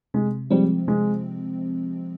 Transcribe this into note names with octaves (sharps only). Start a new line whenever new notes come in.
C3 G#3
F3 G3 G#3 C4
C3 G#3